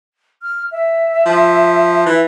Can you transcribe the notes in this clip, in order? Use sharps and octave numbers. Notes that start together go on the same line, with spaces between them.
F6
E5
F3
E3